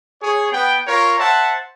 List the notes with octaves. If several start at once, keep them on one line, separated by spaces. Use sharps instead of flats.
G#4 C#5
B3 G5
F4 A#4 C#5
C5 E5 F#5 A5